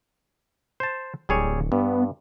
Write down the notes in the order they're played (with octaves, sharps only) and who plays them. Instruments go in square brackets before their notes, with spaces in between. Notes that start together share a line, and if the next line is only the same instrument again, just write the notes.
[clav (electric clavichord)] C5 A5
[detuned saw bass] D1 [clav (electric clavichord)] G3 G#4 C#5
[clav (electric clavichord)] G2 [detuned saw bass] B3